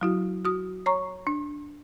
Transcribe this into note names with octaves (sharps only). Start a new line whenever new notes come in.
F#3 E4 F#4
F#4 D#6
C#5 A#5 C#6
D4